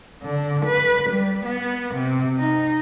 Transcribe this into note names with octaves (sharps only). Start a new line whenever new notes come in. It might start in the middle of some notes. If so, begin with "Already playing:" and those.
D3
B4
G3
B3
C3
D#4